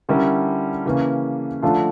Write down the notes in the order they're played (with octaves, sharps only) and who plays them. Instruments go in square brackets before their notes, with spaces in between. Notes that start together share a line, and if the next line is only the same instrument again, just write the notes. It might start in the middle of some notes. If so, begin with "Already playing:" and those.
[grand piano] D3 G3 C#4 E4 A#4
C#3 E3 A#3 C#4
D3 F3 A3 D4 F4